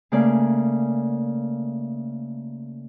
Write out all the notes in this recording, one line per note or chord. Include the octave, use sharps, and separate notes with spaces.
C#3 A3 A#3 D5 G#5